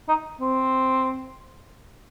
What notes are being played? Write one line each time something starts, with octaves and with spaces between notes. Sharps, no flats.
D#4
C4